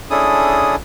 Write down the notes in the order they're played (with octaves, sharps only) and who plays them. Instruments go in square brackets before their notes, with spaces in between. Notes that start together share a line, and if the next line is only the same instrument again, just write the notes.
[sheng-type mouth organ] C#4 D4 E4 G#4 A4 D#6